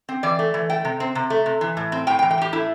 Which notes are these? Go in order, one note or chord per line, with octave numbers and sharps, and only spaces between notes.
C4
E3 D5
A3
E3
A3 G5
C3
C4
C3
A3
C3
E3
A2
C4
A2 G5
G5
E3
G5
A2 G4
A3 E4